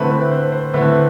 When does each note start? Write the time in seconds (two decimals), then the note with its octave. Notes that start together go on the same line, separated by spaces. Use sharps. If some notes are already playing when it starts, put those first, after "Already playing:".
Already playing: D3 A3 C4 E4 B4
0.11 B4
0.31 C5
0.52 C5
0.74 D3 A3 C4 E4 B4